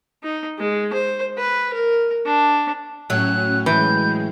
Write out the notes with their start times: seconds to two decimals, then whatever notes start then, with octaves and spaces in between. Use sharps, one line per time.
0.23 D#4
0.58 G#3
0.93 C5
1.38 B4
1.73 A#4
2.25 D4
3.10 A2 F#3 C#4 F#6
3.66 E3 G#3 G6